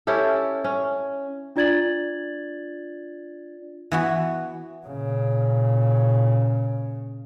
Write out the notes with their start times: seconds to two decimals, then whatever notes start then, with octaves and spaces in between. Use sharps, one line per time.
0.07 C#4 E4 G4 A4
0.64 C#4
1.56 D4 F4 D5 G#6 A6 F#7
3.92 E3 B3 F#4
4.86 A#2 C#3